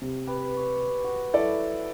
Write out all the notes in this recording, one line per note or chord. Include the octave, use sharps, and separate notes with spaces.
C3
G4 B4
C#5
F#4
F#3 E4 A4 D5